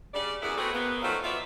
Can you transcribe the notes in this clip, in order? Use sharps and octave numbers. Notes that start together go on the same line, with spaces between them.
C#3 G3 D5
F#2 E3 B3 E4 G#4 D5
A3 B3 C4 F#4 G#4
A#3 B3
D#3 F3 F#3 A3 F4 C5
B2 B3 F4 D5 E5